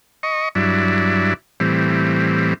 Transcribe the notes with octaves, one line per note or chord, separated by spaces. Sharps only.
D#5 C#6
G2 F#3 D4 E4
A2 E3 G3 C4